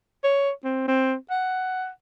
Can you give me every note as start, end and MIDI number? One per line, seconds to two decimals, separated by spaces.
0.24 0.51 73
0.65 0.85 60
0.88 1.15 60
1.30 1.89 78